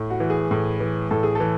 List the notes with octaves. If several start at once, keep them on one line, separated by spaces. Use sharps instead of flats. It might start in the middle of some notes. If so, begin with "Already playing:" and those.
Already playing: A2
F#4
E3
G#4
A2
E3
A2 A4
G#4
E3 A4